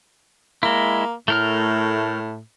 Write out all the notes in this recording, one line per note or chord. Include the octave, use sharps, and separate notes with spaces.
G#3 A#3 E4
A2 A3 A#4 F6